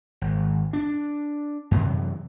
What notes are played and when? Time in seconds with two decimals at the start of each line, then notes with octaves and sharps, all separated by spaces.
0.21 G#1
0.73 D4
1.71 F#2 C3 E3